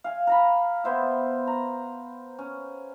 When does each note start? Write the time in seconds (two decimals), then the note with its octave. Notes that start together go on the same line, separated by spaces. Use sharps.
0.04 F5 G#5
0.27 A#4 A#5 B5
0.84 B3 C5 E5
1.47 A#5
2.39 C#4